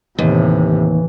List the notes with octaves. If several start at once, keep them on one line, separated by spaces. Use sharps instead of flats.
D#2 A2 C3 E3